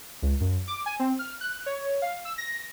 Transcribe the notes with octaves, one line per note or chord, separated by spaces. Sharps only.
C#2
F#2
D6
G#5
C4
F6
F#6
C#5
F5
E6
A#6